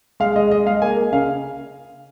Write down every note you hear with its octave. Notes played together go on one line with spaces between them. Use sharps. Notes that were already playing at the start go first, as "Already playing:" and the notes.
G#3 F5
G#3 D#5
G#3 D#5
G#3 F5
A#3 G#5
A#3
C#3 F5